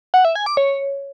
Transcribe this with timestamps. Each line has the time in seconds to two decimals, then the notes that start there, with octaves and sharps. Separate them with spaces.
0.14 F#5
0.25 E5
0.35 G#5
0.46 D6
0.57 C#5